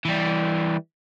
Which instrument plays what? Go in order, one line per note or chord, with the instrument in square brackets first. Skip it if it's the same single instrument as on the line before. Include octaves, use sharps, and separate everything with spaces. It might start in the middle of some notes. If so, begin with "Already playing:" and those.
[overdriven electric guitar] E3 G3